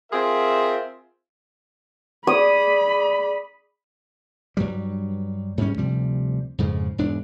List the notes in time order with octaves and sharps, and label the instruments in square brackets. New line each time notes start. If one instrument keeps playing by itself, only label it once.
[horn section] C4 F4 G#4 A#4 E5
[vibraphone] G#4 D5 D6 [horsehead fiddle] B5 [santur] D#6
[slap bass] G2 F#3 G3
G#2 G3 G#3 C#4
D2 C3 F3 G3
F2 G#2 C#3 F3
E1 G#2 D4